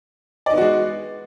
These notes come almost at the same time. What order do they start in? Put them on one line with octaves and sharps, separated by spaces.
D5 D#4 B3 F#4 G#3